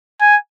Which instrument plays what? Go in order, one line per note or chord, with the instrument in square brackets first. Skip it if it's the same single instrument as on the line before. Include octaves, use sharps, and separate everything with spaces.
[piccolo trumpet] G#5